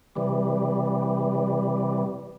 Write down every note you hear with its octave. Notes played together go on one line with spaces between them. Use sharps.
C3 E3 G3